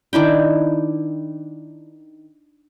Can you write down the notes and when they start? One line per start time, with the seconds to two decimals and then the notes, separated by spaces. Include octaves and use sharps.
0.13 D#3 D4 E4 G5